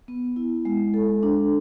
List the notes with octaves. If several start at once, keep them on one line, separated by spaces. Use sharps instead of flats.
B3
E4
G#3
A4
D4